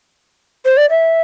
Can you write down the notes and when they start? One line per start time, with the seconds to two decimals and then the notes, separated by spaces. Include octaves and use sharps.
0.65 C5
0.77 D5
0.90 E5